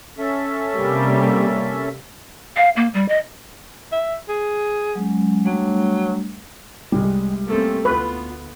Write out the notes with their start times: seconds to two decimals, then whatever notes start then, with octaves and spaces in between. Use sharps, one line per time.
0.18 C#4 A4 E5
0.75 C3 G3 A#3
2.56 F5
2.77 A#3
2.94 G3
3.08 D#5
3.92 E5
4.29 G#4
4.95 F#3 G#3 C#4
5.45 F#3 G3 A3 D4
6.92 C2 C3 G3 G#3
7.47 A3 A#3 C4 C#4 A4
7.85 D2 B3 F4 B4